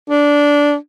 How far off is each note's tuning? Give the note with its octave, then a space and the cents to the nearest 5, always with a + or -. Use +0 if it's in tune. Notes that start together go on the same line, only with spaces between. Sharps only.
D4 -15